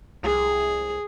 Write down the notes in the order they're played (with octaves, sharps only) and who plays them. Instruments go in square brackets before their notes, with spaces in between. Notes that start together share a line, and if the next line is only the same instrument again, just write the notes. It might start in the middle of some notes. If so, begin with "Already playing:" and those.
[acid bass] C2 [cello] G#4